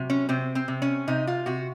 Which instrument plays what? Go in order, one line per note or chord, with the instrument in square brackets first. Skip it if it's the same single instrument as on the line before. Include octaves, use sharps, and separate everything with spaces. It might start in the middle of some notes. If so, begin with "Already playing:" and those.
Already playing: [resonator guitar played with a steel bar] C3 F#3
C#4
C3 C4
C4
C3
C#4
C3 D#4
F4
C3 F#4